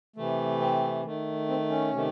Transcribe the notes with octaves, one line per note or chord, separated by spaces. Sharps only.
C3 E3 A3
C4
D#3 A3
C4
C#4
C3 D#3 A3